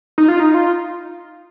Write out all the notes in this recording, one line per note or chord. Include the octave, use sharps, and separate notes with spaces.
D#4
F4
D#4
F4